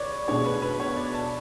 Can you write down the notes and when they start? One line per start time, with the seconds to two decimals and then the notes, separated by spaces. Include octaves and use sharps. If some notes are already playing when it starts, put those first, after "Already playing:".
Already playing: B4 C#5 D5
0.28 B2 A3 D4 G#4 C#5
0.46 B4
0.62 B4
0.80 C#5
0.97 D5
1.14 A5